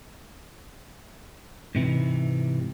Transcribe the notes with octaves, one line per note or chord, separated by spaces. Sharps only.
G#2 C3 E3